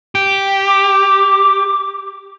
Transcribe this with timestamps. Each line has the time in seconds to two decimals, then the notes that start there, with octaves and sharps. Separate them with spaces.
0.15 G4
0.66 D6